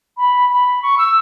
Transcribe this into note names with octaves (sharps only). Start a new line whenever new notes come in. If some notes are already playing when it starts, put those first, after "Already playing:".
B5
B5
C#6
E6